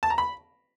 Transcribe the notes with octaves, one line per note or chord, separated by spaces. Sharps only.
A5
A#5
B5